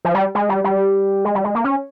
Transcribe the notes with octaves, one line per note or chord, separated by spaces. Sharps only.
F3
G3
G#3
G3
G3
G#3
G3
G#3
A#3
C#4